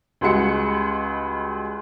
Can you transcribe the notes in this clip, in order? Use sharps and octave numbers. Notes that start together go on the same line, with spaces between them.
C#2 G3 G#3 F#4 C#7